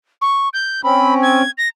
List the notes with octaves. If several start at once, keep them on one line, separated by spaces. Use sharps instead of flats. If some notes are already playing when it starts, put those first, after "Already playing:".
C#6
G6
C4 C#4 B5
G#6
A#6